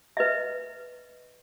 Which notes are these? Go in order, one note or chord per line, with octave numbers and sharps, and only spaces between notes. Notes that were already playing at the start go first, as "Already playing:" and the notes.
B4 D#5 E5